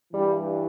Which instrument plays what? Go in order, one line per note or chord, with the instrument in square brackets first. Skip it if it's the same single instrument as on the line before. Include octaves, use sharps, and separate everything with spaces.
[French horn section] G2 E3 G3